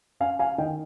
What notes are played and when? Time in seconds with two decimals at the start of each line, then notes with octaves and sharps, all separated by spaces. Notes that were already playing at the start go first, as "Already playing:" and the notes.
0.20 C#4 F5 G#5
0.39 F5 G#5
0.58 D#3 D#5 G5